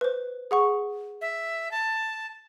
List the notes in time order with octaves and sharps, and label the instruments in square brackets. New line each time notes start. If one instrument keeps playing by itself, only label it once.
[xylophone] B4 C5
G#4 F#5 C#6
[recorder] E5
A5